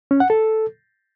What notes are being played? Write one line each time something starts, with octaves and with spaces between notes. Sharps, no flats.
C#4
F#5
A4